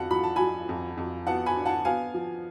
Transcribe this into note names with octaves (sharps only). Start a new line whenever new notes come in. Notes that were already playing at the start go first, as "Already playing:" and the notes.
Already playing: F2 F3 F#5 A5 B5
F3 B5
A5
F3 G#5 B5
F2
F2
B3 F#5 A5
G#5 B5
D4
F#5 A5
B3 F5 G#5
F3